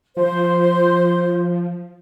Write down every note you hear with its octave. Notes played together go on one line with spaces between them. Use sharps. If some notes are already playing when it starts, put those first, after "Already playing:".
F3 C5